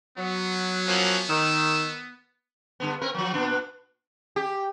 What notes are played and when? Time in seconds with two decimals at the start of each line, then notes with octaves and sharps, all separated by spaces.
0.18 F#3 B3
0.88 F3 A#3 C#4
1.29 D#3 E6
2.80 G2 D3 B3
3.01 C4 A#4 B4
3.14 F3 F#3
3.34 A#2 B3 D4
4.36 G4